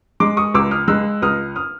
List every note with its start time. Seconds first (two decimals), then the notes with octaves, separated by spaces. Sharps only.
0.20 G#3 C6 D6
0.37 C#6 D#6
0.54 C#2 D6 E6
0.71 D#6 F6
0.88 G#3 E6 F#6
1.22 C#2 D#6 F6
1.56 D#6 F6